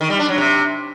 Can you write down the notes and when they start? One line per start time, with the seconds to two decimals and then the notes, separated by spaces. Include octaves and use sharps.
0.01 D#3
0.10 G3
0.19 D4
0.29 F#3
0.38 C3